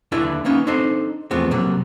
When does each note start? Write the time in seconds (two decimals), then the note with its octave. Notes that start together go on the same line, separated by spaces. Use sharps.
0.12 D#2 D3 E4 B4 D5 E5
0.45 A#3 B3 C#4 D#4
0.67 C4 D4 D#4 A4 C5
1.31 E2 F3 A3 B3 C4
1.51 C3 F#3 G3 A#3